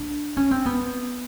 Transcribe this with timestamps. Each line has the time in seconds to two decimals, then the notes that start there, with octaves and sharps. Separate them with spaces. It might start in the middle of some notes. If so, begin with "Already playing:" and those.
Already playing: D4
0.37 C#4
0.51 C4
0.66 B3